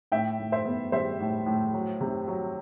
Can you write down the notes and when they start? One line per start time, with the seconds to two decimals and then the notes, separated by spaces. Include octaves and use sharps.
0.12 A2 E5 G5
0.39 A2
0.52 C5 E5
0.65 B3
0.92 G3 C5 E5
1.20 A2
1.46 A2
1.73 F#3
2.01 C3
2.28 F#3